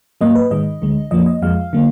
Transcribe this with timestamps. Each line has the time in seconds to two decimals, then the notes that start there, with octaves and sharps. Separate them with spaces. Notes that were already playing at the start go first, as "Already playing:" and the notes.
0.21 G#2 F#3 A#3 D#5
0.36 B4
0.50 G#2 D#3 G#3 D#5
0.82 D2 D3 G#3
1.11 F2 F3 A#3 D#5
1.26 D#5
1.42 F2 F3 G#3 F5
1.73 D3 F#3 A#3